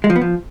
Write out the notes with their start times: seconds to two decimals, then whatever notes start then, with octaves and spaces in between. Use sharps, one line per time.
0.04 G#3
0.10 F3
0.16 B3
0.21 F3